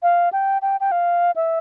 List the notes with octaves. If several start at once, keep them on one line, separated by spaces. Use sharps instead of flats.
F5
G5
G5
G5
F5
E5